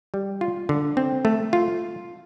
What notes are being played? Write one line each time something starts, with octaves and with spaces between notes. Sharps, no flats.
G3
F4
D3
C4
A3
F4